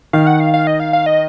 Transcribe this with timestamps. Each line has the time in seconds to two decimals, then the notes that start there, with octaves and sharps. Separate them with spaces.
0.13 D#3 F5
0.27 F#5
0.40 F5
0.54 F5
0.67 D#5
0.80 F5
0.93 F5
1.06 D#5